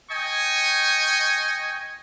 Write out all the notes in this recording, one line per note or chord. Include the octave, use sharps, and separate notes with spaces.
D#5 G5 G#5 C#6